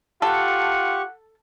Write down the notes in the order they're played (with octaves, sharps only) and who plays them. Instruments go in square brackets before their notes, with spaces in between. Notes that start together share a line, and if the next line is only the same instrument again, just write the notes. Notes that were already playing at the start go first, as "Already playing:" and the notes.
[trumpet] F4 [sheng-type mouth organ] G4 C#6 [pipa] A4 [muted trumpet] F#5